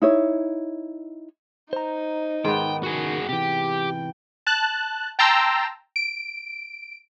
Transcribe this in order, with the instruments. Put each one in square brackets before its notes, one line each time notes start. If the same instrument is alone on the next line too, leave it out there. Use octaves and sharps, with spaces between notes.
[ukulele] D#4 E4 C#5
[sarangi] D#4 [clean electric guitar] C5 A#5
[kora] G#2 B3 [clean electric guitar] D#3 [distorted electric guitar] G5
[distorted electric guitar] F#4 G#4
[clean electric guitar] C3 E3 [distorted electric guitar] G4 [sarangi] G5
[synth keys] A5 F#6
G5 A5 A#5 C6 E6
D7